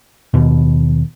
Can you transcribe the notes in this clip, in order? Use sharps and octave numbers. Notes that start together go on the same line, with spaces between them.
D#2 B2